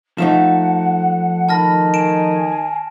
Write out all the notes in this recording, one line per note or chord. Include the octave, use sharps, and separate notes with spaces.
F3 A3 D#4 F#5 E7
D#3 A5 B5 F6 A#6
G#5 D7 E7